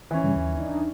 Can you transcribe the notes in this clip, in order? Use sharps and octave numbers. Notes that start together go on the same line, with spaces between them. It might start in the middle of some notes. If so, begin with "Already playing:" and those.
E3 C#4
G2 C#3
D#2
D4 D#4